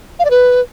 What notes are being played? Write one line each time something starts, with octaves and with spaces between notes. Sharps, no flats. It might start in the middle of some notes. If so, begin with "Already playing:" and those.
F5
D5
B4